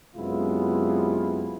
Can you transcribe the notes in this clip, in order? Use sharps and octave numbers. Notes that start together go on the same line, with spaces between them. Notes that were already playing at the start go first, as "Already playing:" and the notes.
F#2 C3 G#3 B3 E4 F4